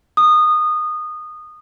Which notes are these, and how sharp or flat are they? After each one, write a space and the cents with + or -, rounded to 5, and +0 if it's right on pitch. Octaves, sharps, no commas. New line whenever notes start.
D#6 -20